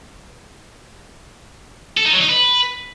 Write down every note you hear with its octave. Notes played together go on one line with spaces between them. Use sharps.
A4
D#4
F#3
D#4
B4